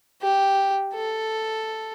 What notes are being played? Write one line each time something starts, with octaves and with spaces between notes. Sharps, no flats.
G4
A4